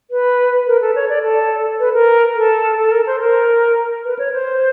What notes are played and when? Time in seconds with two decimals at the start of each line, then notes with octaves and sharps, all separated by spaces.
0.11 B4
0.67 A#4
0.81 A4
0.95 C#5
1.09 D5
1.23 A4
1.80 B4
1.94 A#4
2.36 A4
2.78 A4
2.92 A#4
3.07 C5
3.20 A#4
4.05 B4
4.19 C#5
4.33 C5